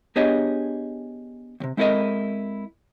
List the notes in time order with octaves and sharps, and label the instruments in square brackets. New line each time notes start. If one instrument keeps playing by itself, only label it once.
[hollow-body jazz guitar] B3 D4 G4 G#4 C#5 D#5
D#2 C3
G#3 C4 E4 A4 A#4 D#5